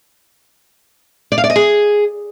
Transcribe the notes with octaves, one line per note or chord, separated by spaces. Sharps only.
D5
F5
D5
D#5
G#4